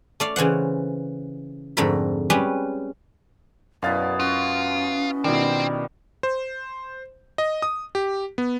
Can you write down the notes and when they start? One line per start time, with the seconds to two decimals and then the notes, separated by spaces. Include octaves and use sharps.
0.20 A3 D5 F5
0.36 C#3 E3 C5 F#5
1.77 F2 G#2 D3 A3 A#4 B5
2.30 G3 G#3 C#4 G4 B4
3.82 F#2 B2 B3 E4 D5 F5 A6
4.20 C#4 F4 F#4
5.24 B2 D#3 G3 C4 E4
6.23 C5
7.38 D#5
7.62 D#6
7.95 G4
8.38 B3